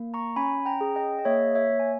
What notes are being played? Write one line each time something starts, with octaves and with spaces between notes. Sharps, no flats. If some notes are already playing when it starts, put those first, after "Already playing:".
Already playing: A#3
A#5 C#6
C#4 G#5 B5
G5 A#5
G#4
D#5 G5
D#5
A#3 C#5 E5
C#5 E5
A#3
G#5